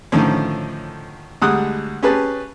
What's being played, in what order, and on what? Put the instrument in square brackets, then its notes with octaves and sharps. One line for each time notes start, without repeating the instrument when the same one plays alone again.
[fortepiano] A2 D3 D#3 F3 C#4
D2 G3 G#3 F#5 D#6 F#6
C#4 G4 G#4 B4 A5